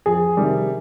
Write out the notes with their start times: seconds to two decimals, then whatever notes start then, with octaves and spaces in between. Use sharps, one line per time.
0.06 F2 G#4
0.37 C3 D#3 G3